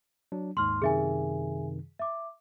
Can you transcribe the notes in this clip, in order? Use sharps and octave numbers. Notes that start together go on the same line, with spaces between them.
F#3 D4
D#2 G#2 C6 F6
F#2 C3 D#3 G#4 E5 G#5
E5 D6